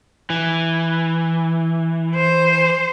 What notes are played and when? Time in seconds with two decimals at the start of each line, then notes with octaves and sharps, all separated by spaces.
0.30 E3
2.15 C5